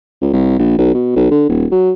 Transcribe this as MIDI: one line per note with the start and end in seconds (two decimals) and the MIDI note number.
0.22 0.32 37
0.33 0.55 36
0.59 0.73 34
0.78 0.94 35
0.94 1.14 47
1.16 1.30 35
1.31 1.46 50
1.49 1.66 27
1.71 1.91 54